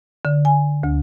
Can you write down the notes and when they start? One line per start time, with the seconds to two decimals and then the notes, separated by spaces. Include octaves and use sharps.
0.25 D3
0.45 G#5
0.83 D2